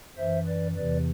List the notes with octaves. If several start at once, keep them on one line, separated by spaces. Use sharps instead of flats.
F#2 E3 C5 E5
B4 D5
E2 C3 E3 B4 D5